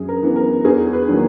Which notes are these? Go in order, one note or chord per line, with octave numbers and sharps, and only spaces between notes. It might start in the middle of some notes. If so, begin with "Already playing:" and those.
Already playing: F#2 G#4
A#4
E3 B3
A#4
E2 G#4
B4
D#3 F#3 A#3